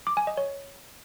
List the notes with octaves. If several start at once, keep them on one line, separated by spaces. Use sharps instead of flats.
D6
G#5
D#5
C#5